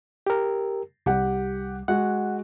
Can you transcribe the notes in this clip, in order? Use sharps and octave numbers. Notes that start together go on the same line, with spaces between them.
G4 A#4
C2 G3 G4 F#5
G#3 F#4 F#5